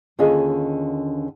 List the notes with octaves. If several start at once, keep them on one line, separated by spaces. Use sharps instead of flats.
D#2 D3 C#4 F4 G#4 D#5